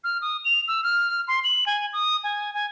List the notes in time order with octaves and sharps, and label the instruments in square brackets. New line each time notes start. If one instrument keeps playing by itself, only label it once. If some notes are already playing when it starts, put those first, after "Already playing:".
[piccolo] F6
D#6
F7
E6
F6
C6
F#7
G#5
D#6
G#5
G#5